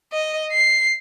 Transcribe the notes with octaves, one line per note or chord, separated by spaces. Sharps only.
D#5
C7